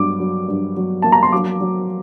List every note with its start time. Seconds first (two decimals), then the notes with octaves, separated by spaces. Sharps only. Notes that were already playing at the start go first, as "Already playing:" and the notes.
Already playing: G2 F#3 D6
0.20 F#3
0.48 G2
0.77 F#3
1.02 A#3 A5
1.12 A#5
1.23 C6
1.32 F#3 D6
1.61 F#3